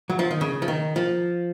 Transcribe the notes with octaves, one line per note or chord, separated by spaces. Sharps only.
F#3
F3
D#3
C#3
F3
D#3
F3